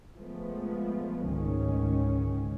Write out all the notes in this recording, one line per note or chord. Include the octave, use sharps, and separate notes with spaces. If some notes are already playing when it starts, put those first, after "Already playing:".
F3 G#3 A3 B3
C#2 G#2 D#3 C#4